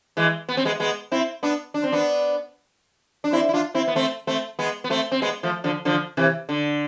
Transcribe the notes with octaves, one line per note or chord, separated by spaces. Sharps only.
E3 G#3
B3
C4
G#3 B3
G#3 B3
C4 E4
B3 D4
D4
C4
B3 D4
D4
C4 E4
E4
D4 F4
C4 E4
B3
A3 C4
A3 C4
G#3 B3
B3
A3 C4
C4
G#3 B3
F3 A3
D3 F3
D3 F3
C3 E3
D3